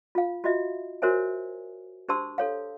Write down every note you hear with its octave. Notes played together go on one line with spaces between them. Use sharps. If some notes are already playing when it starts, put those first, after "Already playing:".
F4 F5
F4 F#4 D#5 E5
F#4 A#4 C5 C#5 E5 G#5
D4 G4 C5 A5 C6 E6
A4 C#5 F5